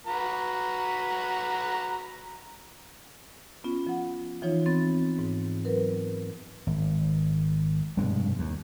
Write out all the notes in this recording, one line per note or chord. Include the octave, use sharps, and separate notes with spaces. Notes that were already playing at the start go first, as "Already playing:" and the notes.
F#4 B4 A#5
B3 C#4 F4
F3 F#5
E3 F3 D#4 F4 C#5
B3 C4 A6
G#2
F#3 A#4 B4
G#1
F1 G2 B2 G#3
D#2